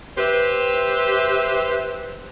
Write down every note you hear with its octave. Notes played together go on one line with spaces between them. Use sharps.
G4 B4 C5 E5